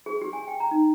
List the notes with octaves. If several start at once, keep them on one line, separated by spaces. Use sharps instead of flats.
G#4
G4
G#5
G5
A#5
D#4